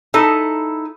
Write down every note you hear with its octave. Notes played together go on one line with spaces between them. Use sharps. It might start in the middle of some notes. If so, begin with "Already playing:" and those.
D#4 E4 A4